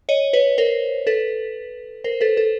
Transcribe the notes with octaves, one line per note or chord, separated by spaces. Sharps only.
C#5 D#5
B4 C#5
A#4 C5
A4 B4
A#4 C5
A4 B4
A4